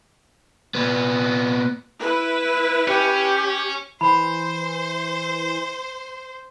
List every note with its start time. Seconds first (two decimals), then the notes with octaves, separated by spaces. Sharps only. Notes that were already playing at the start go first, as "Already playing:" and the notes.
0.75 A#2 B3
2.00 E4 B4
2.88 C#4 G4
4.01 E3 C5 B5